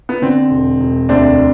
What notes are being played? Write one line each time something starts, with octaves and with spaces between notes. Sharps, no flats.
B3
D3 C4
E1
E1
D2 C4 D4